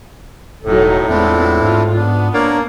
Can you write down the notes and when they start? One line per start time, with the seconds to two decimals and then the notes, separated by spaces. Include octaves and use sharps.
0.66 E1 A2 F#3 D#4 A4
1.09 E2 G#3 B3 C4 D4 E4 F4
1.62 G#2 F4
1.96 B3 D4
2.34 A#3 D4 A#4 C#5 D5